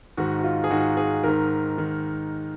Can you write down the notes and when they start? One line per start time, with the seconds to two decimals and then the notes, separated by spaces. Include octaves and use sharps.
0.17 G#2 D#3 F#4
0.39 F#4
0.44 F4
0.64 G#4
0.70 G#2 D#3 F#4
0.97 G#4
1.24 G#2 D#3 A#4
1.78 D#3